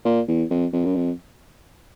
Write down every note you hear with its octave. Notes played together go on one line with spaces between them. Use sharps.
A#2
E2
F2
F2
F#2
F2